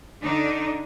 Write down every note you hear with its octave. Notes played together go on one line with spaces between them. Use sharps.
D3 D4 D#4